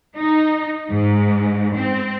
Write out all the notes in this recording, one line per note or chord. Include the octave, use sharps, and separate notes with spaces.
D#4
G#2
C4